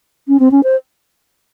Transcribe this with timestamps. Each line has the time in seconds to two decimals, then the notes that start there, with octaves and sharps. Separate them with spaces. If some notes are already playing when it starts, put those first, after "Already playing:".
0.28 C#4
0.40 C4
0.51 C#4
0.63 C5